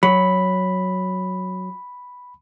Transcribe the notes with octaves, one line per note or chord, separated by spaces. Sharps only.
F#3 B5